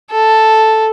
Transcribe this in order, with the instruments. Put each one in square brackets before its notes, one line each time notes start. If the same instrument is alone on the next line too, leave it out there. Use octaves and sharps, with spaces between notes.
[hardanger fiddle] A4